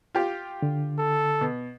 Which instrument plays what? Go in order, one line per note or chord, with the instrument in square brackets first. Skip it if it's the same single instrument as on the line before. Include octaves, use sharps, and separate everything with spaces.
[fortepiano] F4 G4
[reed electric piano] D3
[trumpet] A4
[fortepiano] B2